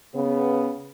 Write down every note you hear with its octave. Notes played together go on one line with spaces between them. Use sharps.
C#3 B3